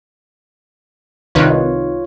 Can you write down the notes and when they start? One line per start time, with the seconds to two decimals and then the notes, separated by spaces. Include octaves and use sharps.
1.35 C2 D#3 F4 B4 C#5